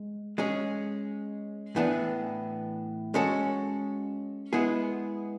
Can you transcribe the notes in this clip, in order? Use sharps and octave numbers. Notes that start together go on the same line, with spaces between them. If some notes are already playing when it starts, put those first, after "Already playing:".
Already playing: G#3
G#3 C#4 G#4
A2 E3 B3 D4 G#4
G#3 C#4 F#4 A4
G#3 B3 E4 G#4